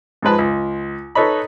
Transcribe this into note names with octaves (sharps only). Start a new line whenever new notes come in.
G#2 F3 G#3 B4 A5
C#2
D#4 A4 B4 C#5 D#5 B5